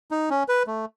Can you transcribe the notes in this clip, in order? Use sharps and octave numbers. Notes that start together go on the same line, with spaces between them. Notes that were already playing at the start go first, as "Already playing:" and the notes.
D#4
C#4
B4
A3